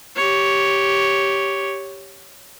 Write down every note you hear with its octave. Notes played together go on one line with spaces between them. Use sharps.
G4 C#5